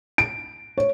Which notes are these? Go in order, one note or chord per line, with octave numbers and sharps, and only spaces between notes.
D7
C#5